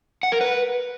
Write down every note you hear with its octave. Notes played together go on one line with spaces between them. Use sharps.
F#5
A#4
B4